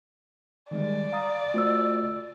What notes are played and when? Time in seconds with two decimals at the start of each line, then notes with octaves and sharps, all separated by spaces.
0.71 D#3 G3 G#3 D5
1.12 F5 A#5 D#6
1.54 A3 F4 F#4 C5 E6